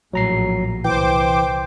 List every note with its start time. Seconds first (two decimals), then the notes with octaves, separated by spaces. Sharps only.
0.13 A#1 A2 F#3 A#5 C7
0.85 C2 E3 C5 G5 D6